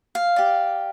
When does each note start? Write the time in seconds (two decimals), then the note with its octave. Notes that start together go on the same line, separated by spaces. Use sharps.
0.15 F5
0.36 G4 D5